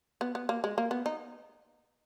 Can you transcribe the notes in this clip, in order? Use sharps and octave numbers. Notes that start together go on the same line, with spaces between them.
B3
B3
A#3
G#3
A#3
B3
D#4